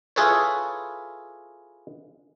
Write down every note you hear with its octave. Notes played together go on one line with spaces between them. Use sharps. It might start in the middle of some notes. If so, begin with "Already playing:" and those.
E4 F4 G#4 A4 B4 C#5